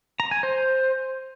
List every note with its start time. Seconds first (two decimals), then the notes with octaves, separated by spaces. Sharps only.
0.20 A#5
0.31 G#5
0.43 C5